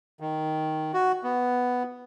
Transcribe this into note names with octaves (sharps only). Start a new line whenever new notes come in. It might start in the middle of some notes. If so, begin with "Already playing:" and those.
D#3
F#4
B3